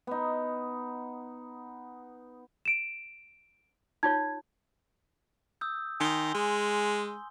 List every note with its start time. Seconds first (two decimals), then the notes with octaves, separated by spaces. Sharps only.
0.07 B3 D#4
2.65 D7 E7
4.03 D#4 F4 C#5 G#6
5.61 D#6 E6 G6
6.00 D#3 G#5 C6 G7
6.35 G#3